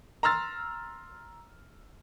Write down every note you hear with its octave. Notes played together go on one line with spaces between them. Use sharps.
A#5 C6 E6 F6 A6